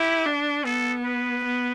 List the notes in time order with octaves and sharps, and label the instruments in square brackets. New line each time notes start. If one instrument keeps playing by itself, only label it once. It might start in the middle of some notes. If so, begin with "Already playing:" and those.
Already playing: [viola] E4 [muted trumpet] G4
[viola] D4
[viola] B3 [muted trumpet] A4
[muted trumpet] B4
[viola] B3